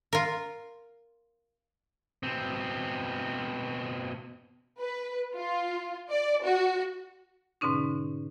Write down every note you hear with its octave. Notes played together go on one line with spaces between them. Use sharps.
F4 A#4
B2 C4
B4
F4
D5
F#4
G#2 B2 D3 C#4 D#4